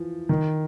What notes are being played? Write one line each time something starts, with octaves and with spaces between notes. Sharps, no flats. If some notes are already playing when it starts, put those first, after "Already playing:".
Already playing: E3 F3
D#3